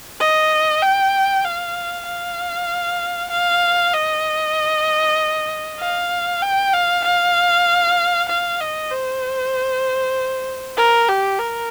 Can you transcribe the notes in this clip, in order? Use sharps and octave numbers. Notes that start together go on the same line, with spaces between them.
D#5
G5
F5
F5
F5
D#5
F5
G5
F5
F5
F5
D#5
C5
A#4
G4
A#4